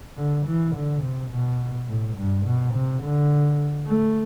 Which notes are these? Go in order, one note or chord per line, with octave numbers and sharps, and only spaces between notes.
D3
E3
D3
C3
B2
A2
G2
B2
C3
D3
A3